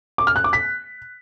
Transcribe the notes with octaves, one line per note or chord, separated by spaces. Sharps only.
D6
F6
F#6
D6
B6